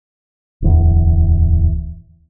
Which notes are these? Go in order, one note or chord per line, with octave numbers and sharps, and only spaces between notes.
D1 E2